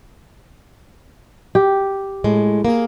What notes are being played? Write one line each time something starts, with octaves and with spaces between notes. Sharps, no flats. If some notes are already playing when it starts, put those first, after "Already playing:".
G4
A2 G#3
A#3 G#4